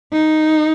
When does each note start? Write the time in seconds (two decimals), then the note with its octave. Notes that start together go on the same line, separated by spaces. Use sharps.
0.12 D#4